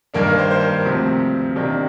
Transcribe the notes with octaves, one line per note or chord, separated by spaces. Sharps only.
G2 D#3 A#3 D4 A#4
A#4
C5
C5
A#4
D2 C3 F3 C4
C3 D#3 A#3 D4